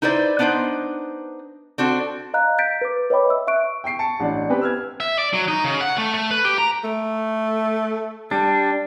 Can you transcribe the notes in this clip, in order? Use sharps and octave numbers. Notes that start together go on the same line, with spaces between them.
D#4 E4 B4 C5 D5
B3 D4 D#4 B4 C5
C4 D4 F#4 A4
D#5 F5 A#5 F#6
G6 A6 B6 D7
B4 D6
B4 C#5 D#5 G5 B5 D6
E5 E6
E5 C#6 F#6 D7
G5 C#6 C7 D7
A5 C#7
A1 D4 D5
B3 C4 G4 B4
E6 F6 G#6
E5
D5
F#3
D#4
C#3
F#5
A3
A3
B4
G4
A#5
A3
G3 D4